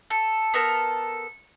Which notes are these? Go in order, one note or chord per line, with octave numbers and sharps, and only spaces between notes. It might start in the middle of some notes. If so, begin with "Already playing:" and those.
A4
B3 A4 A#4